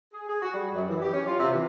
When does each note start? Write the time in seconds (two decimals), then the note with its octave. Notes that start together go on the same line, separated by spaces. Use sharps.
0.13 G#4
0.28 G#4
0.42 F#4
0.53 G3
0.73 F#2
0.88 E3
1.01 G4
1.14 C#4
1.27 F4
1.40 C3
1.53 E3